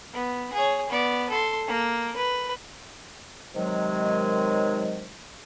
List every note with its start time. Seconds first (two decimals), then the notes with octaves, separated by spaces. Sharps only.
0.13 B3
0.53 G#4 C#5
0.90 B3 D5
1.30 A4 C6
1.67 A#3
2.17 B4
3.55 C3 D#3 F#3 G#3